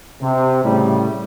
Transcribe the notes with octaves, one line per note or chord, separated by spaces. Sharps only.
C3
A2 C#3 G3